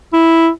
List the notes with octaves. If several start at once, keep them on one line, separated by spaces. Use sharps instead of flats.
E4